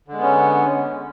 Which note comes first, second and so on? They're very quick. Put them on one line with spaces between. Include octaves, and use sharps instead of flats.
D3 G#3 B3 C#4